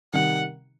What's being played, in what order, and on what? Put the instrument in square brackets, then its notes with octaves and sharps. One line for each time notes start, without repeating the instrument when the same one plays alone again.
[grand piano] C3 D#3 G3 [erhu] F#5